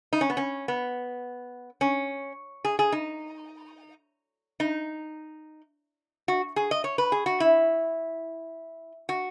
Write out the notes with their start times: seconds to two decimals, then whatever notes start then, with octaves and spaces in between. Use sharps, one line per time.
0.13 D#4
0.21 C#4
0.30 B3
0.37 C#4
0.68 B3
1.81 C#4
2.64 G#4
2.79 G#4
2.92 D#4
4.60 D#4
6.28 F#4
6.56 G#4
6.71 D#5
6.84 C#5
6.98 B4
7.12 G#4
7.26 F#4
7.40 E4
9.09 F#4